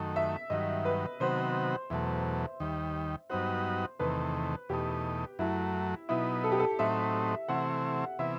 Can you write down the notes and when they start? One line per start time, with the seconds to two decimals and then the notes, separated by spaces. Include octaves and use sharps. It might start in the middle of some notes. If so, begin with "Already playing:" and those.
Already playing: F#2 D#3 A3
0.16 E5
0.50 G2 D#3 F#3 D#5
0.85 B4
1.20 C3 D#3 F#3 B3 F#4 C5
1.90 E2 B2 F#3 A3 E5
2.60 D#2 D#3 G3
3.30 G2 F#3 B3 D#4 F#4 C5
3.99 E2 C3 D#3 A3 B4
4.69 E2 B2 A3 D#4 G4
5.39 F#2 F#3 A3 E4
6.09 B2 F#3 B3 D#4 E4
6.44 A4
6.52 G4
6.60 A4
6.79 A2 F#3 A3 C4 D#4 E5
7.48 C3 E3 A3 C4 E4 F#5
8.19 C3 E3 B3 E4 E5